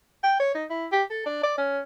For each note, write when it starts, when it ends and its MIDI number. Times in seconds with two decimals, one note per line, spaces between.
0.23 0.38 79
0.40 0.51 73
0.55 0.64 63
0.70 0.87 64
0.92 1.03 67
1.10 1.24 69
1.26 1.42 62
1.43 1.58 74
1.58 1.81 61